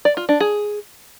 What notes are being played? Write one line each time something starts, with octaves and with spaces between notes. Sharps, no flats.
D5
F4
D4
G#4